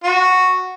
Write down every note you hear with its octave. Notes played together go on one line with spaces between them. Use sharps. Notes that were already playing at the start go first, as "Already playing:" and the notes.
F#4